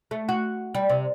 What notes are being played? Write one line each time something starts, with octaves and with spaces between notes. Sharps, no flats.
A3
F#4
G3
C3